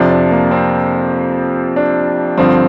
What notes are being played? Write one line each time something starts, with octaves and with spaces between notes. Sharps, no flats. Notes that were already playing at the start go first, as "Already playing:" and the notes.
Already playing: F2 C3 F3 D4
D4
A#3
C4
D4
G2 D3 F3 C4